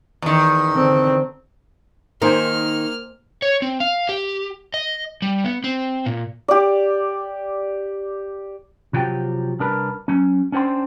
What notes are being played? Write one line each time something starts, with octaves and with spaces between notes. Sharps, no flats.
E2 D#3
D3 C4
D#3 A#3 A#4 C5 G#5 F6
C#5
C4
F5
G4
D#5
G3
B3
C4
A#2
G4 D5
C3 F3 F#3 G4 G5
C2 D4 A#4 B4
F#3 C#4
C#4 D4 C5 G5 C6